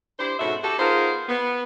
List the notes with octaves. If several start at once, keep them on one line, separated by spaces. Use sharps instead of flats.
D4 E4 G4 C5
G#2 B2 C#4 F#4 A4 E5
F#4 G4 A4
B3 D#4 F4 G#4 A#4 C5
B3